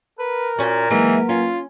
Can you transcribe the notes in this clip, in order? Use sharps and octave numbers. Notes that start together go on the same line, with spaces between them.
A#4 B4
A#2 C#4 F#4
E3 F#3 G#3 A#3 D#4 E4 B4
C#4 F4